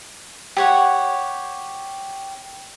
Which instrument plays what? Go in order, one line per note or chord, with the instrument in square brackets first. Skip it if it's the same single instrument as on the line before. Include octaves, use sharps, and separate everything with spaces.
[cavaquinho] G4 C#5 F#5